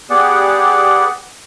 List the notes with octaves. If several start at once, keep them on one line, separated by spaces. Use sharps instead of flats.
B3 G4 G#4 D5 F#5